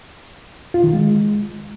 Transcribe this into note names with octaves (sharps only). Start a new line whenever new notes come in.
F4
D#3
G#3